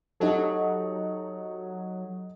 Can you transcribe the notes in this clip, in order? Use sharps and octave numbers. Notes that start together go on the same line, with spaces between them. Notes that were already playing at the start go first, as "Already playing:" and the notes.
F#3 D#4 G4 A4